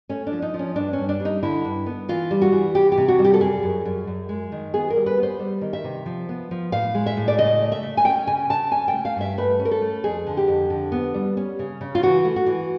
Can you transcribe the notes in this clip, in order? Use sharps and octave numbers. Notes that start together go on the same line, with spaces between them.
A3 C#4
D4
F3
D#4
F3
C#4
G2 D4
C#4
G2
D4
G3
D#4
D3 E4
G2
B3
E3 F4
G3
F#4
E3
C3 G4
G4
C3
F#4
G3
G4
A4
F#2 G#4
F#2
F#2
F#2
G#3
D#3
B3 G#4
A#4
G3
B4
B3
C5
G3
D#3
E5
C3
F3
B3
F3
A2 F5
G#3
E5
A2
D5
C#3 D#5
A3
E5
A3
G#5
C#4 G5
C#3 G#5
C#3 A5
C#4 G#5
G5
A3
F5
G2 E5
A3 B4
C#4
A#4
A4
A3
F2 G#4
D3
G4
F2
D3
B3
G3
C#4
C#3
C#3
F4
E3 F#4
A3
F#4
E3